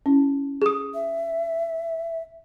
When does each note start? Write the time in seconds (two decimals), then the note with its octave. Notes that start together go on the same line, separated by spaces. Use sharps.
0.06 C#4 E4
0.62 G#4 D#6
0.94 E5